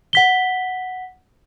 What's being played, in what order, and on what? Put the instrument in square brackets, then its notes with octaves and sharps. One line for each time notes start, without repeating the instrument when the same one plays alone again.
[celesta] F#5 B6 G7